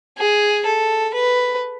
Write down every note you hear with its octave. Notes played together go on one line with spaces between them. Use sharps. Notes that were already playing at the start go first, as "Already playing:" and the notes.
G#4
A4
B4